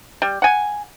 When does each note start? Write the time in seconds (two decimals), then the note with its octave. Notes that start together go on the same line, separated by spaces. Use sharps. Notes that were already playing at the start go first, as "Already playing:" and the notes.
0.22 G3
0.42 F#5 G#5